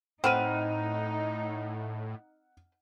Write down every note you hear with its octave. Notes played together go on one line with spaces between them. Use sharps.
A2 C4 D#4 B4 F#5 F6 D#7